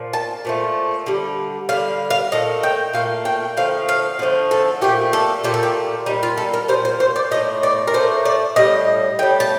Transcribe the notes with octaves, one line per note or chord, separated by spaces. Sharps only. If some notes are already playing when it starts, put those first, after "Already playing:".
Already playing: A#2 F3
A5
A#2 F3 A3
D3 G3
D3 G3 F5
F5
A#2 A3 D#5
G5
A#2 A3 F5
G5
D3 F3 A3 F5
F5
D3 F3 A3
A4
A#2 A3 G4
A4
A#2 A3 G4
A4
G4
A#2 G3 D#4
F4
A4
A#4
G3 C5
A#2
C5
C5
D5
A2 A3 D#5
D5
A#4
A2 A3 C5
D5
A2 G3 D#5
A2 G3 G5
A5